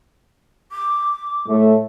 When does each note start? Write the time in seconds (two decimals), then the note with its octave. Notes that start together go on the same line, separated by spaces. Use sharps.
0.72 D6
1.48 A2 A3